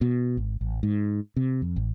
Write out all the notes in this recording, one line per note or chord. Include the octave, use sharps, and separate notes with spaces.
B2
G#1
A1
G#2
C3
F2
A1